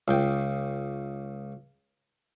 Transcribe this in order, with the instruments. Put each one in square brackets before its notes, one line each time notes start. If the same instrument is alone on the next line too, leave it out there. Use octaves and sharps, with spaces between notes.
[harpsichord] C#2 G5